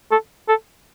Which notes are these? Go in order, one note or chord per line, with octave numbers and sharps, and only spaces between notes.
A4
A4